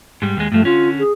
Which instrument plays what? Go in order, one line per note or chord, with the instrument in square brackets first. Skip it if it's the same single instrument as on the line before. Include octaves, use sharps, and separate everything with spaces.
[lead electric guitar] G#2 G3
D#2 G#3
[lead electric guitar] G2 F3 [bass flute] A3
[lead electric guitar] D3 C#4 [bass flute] F4
[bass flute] G#4